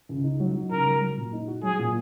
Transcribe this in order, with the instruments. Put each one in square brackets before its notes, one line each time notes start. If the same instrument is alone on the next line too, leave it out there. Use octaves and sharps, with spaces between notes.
[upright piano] C#2
D#4
F#3
D#4
[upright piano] C#3 [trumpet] A#4
[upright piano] F#3
F#3
A#2
D#4
F#4
[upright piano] F#3 [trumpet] G#4
[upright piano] A#2